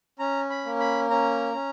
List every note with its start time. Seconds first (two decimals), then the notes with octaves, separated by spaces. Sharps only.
0.19 C#4 A#5
0.50 B5
0.65 A#3
0.80 B5
1.10 C#4 A#5
1.54 C#4